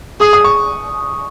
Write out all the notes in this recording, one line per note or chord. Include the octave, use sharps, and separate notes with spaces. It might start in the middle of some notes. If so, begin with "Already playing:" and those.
G#4 D#6
D#6
C#6